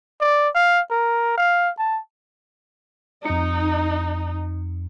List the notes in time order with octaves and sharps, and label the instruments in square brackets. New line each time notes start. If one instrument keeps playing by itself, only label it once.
[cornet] D5
F5
A#4
F5
A5
[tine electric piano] F2 C#7 [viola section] D#4